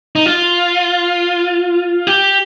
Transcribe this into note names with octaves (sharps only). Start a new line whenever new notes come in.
D#4
F4
G4